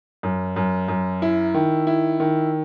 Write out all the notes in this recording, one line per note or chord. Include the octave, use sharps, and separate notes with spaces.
F#2
F#2
F#2
E4
D#3
E4
D#3